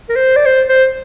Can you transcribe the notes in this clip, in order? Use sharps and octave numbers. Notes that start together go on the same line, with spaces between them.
A#4
C5
D5
C5
C5